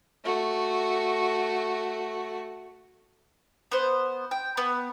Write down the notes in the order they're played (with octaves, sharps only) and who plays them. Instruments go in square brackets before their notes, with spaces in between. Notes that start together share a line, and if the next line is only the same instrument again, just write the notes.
[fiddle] A3 F#4
[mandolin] B3 C5
G5
B3